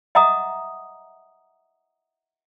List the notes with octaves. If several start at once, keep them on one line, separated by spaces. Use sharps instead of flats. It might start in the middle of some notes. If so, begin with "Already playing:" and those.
D#5 E5 F#5 A#5 D6 D#6